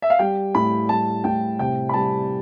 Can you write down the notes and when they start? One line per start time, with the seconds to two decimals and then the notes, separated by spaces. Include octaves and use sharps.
0.02 E5
0.10 F5
0.19 G3 G5
0.55 A2 B5
0.89 G3 A5
1.24 A2 G5
1.59 C3 G5
1.89 B5
1.94 G3 A5